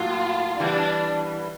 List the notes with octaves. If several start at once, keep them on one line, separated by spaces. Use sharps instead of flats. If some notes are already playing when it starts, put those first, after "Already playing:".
Already playing: A2 F#3 A#3 F4 F#4
E3 G3 B3 D4